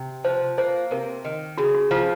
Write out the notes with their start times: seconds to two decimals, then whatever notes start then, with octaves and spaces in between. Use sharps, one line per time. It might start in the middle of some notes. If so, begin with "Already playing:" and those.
Already playing: C3
0.24 F3 C5
0.58 A#3 C5
0.91 C3 A#4
1.25 D#3
1.58 C#3 F#4
1.74 F#4
1.91 F3 F4